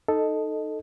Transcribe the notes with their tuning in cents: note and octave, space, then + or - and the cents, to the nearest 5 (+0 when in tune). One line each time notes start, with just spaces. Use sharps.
D#4 -10 A4 +0 D#5 +0